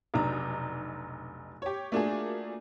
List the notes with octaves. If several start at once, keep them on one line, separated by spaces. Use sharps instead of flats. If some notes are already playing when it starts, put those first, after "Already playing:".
F1 B1 D4 D#4 A#5
G4 C#5
A3 A#3 D4 F4 F#4 G#4